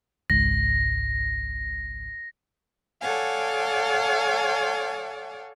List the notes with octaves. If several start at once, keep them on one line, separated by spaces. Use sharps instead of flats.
G#1 C#2 G#2 A#6
A4 C#5 D5 F5 F#5 G#5